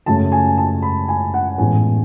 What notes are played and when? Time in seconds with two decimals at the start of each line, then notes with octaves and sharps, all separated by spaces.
0.06 F#2 C#3 F#3 A3 A5
0.32 G#5
0.47 G#5
0.58 A5
0.82 B5
1.08 G#5
1.34 F#5
1.58 A1 A2 G#3 B3 G#5